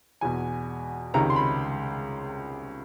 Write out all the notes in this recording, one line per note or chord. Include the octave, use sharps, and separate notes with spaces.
E2 B2 G#5
C#2 C3 D#3 A#5
C6
B5